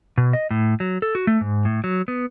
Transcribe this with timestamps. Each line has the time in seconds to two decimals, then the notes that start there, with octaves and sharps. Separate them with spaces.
0.18 B2
0.33 D#5
0.51 A2
0.80 F#3
1.02 A4
1.15 F#4
1.27 A3
1.41 G#2
1.65 A2
1.84 F#3
2.08 B3